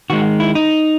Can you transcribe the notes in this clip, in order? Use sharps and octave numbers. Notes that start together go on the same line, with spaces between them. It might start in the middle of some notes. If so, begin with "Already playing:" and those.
D#3 G#3 F#4
E4
D#4